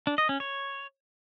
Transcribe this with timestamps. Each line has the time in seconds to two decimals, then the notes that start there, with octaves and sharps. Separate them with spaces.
0.07 D4
0.18 D#5
0.29 C#4
0.40 C#5